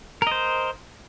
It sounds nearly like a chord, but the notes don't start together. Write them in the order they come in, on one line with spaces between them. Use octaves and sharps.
A#4 D#5 C5